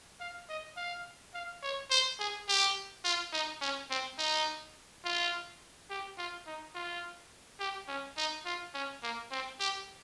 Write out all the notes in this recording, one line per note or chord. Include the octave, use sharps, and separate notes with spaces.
F5
D#5
F5
F5
C#5
C5
G#4
G4
F4
D#4
C#4
C4
D#4
F4
G4
F4
D#4
F4
G4
C#4
D#4
F4
C#4
A#3
C4
G4